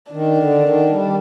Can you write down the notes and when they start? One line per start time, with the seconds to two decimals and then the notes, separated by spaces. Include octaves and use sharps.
0.11 D#3 D4
0.37 D3
0.63 D#3
0.89 G3